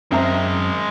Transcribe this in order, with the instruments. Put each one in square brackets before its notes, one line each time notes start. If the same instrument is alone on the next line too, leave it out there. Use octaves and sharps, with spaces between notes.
[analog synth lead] F#2 [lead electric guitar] G#3 A#4 [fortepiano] C4 E5 A#5